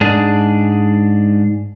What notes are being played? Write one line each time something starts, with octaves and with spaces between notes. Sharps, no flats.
G#2 D4 G#4